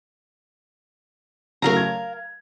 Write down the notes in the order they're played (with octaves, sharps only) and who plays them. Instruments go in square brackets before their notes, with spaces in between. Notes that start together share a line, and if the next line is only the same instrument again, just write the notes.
[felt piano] C#3 F#3 A3 [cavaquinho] A#4 F5 A#5
[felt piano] G#6